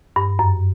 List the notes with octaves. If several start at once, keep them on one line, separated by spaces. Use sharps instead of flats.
G2
F#2